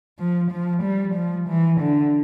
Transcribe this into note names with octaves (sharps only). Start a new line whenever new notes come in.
F3
F3
G3
F3
E3
D3